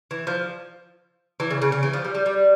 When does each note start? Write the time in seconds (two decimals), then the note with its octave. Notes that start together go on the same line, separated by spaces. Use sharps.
0.11 E3
0.27 F3
1.40 E3
1.50 C#3
1.62 C#3
1.72 C#3
1.83 E3
1.93 F3
2.04 G3
2.15 G3
2.26 G3